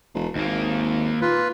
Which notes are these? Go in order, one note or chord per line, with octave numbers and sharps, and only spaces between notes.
E1
G#1 D#2 A#3
A#2 F4 B4